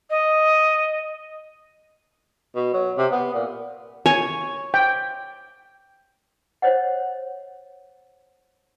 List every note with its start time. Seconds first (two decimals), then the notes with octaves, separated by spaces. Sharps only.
0.10 D#5
2.55 B2
2.73 F#3
2.98 C3
3.12 B3
3.34 A#2
4.06 C#5 G#5
4.74 G5
6.62 C5 C#5 D#5 F#5